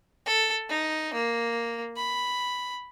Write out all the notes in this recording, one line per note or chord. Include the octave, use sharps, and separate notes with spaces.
A4
D#4
A#3
B5